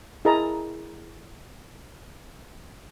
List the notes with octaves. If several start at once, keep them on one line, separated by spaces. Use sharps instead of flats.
E4 G#4 A#4 D#5 A5 A#5